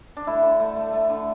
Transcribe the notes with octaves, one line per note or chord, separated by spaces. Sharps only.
D4
A3 E4
D3
A3
A3
A3
D3